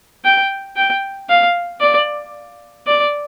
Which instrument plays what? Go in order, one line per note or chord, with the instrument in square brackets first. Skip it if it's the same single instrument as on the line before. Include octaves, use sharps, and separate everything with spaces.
[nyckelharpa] G5
G5
F5
D5
D5